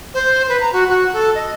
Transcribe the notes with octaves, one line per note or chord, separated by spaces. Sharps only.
C5
B4
A#5
F#4
F#4
A4
D#5